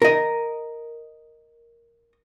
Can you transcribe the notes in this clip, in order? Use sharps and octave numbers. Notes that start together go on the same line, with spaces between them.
A#4 D#5